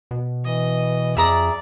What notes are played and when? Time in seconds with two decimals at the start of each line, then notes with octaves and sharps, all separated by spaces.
0.11 B2
0.45 E3 D#5
1.17 F2 G#4 D5 E5 A#5 D#6